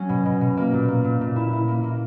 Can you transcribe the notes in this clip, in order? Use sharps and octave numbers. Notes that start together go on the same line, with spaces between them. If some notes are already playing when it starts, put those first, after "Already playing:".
Already playing: F#3 C#4
B2
B2
B2
A#3
A#2
A#3
A#2
A#2
E4
E4
A#3
A#3